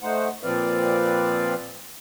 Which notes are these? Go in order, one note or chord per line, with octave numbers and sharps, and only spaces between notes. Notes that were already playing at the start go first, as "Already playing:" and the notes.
A3 D#4 C5 F#5
A#2 F3 C4 B4 D5 F5